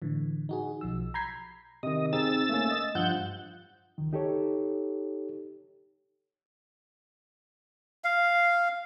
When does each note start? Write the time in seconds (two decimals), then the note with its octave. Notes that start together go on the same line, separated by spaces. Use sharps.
0.02 A2 D3 E3
0.49 D#4 F#4 G#4
0.81 B1 F3 E6
1.14 A#5 B5 G6 G#6 B6 C7
1.83 C3 D#3 D#5
2.13 C4 D#4 G#4 E6 A6
2.49 A3 A#3 C#4
2.70 D#5 D#6
2.95 G2 F3 F#5 G6
3.98 C#2 D#3
4.13 D#4 G4 A4 C#5
8.04 F5